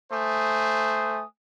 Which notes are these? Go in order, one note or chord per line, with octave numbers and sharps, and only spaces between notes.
A3 C5 G#5 D#6